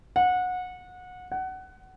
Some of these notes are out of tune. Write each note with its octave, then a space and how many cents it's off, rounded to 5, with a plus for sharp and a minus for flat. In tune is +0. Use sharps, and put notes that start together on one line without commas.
F#5 -25
F#5 +20